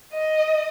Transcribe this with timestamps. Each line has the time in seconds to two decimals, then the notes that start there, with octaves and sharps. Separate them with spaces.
0.13 D#5